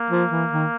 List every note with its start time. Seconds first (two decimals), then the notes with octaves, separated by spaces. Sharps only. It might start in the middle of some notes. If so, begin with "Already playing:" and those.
Already playing: A#3
0.10 F3
0.31 E3
0.51 D#3